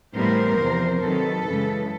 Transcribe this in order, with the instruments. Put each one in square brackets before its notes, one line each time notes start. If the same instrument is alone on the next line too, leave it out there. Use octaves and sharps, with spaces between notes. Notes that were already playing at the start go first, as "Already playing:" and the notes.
[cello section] A2 E3 G3 B3 A#4 C5
E2 C3 F3
C3 D#3 F#3 A4 B4
F#2 C#3 E3 G#3